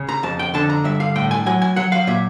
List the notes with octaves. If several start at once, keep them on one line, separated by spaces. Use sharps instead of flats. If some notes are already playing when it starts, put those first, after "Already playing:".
Already playing: C#3
A#5
F2 A5
G5
D3 A5
A#5
G2 E5
F5
A2 G5
G#5
F#3 G#5
G#5
F#3 F#5
F5
A#2 E5